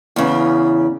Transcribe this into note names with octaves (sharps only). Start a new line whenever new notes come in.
E2 C#3